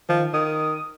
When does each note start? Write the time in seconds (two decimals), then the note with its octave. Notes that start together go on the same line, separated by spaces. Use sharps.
0.09 D#3 F3
0.34 D#3 D#6